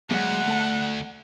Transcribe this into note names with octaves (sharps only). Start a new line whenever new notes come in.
D2 F#3 G#3 A#3 F#5
A3 A5